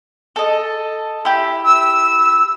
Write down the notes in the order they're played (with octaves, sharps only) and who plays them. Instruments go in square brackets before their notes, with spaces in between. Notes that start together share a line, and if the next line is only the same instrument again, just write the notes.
[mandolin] A4 D#5
E4 G4
[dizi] E6